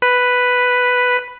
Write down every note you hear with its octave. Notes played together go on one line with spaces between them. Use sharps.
B4